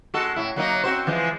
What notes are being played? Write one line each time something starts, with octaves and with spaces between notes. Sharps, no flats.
G#3 F#4 A4
A2 E4
F#3 A#3 D#4
C4 F#4 C5
E3 F3 G#3